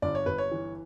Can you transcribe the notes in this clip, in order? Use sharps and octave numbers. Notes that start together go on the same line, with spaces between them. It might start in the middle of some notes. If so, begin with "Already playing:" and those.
G1 D5
C#5
G1 B4
C#5
E3